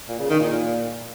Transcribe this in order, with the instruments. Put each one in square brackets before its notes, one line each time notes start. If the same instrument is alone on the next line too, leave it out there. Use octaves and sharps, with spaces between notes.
[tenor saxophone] A#2
C#3
D#3
A#2